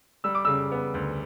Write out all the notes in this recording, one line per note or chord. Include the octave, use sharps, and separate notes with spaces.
G3 E6
D6
C#3 E6
B3
D2